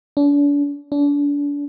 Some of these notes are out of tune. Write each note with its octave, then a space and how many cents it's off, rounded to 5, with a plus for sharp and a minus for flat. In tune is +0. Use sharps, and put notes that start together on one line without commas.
D4 -40
D4 -35